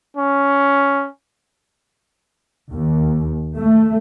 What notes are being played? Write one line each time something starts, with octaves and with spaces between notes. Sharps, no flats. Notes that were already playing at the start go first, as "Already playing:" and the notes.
C#4
D#2
A3